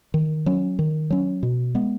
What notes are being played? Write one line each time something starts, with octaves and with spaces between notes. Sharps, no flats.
D#3
F#3 C#4
D#3
F#3 C#4
B2
G#3 B3